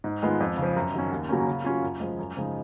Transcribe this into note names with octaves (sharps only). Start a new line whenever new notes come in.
G#2
D#3 G#3 B3 F4
F2
C#3
F3
F#2
D#3 F#3 C#4
D#2
C#3 F#3 A#3 C#4
C#3
F#3 C#4 F4
F#2
F3 G#3
F#2
C#3 F3 G#3 D#4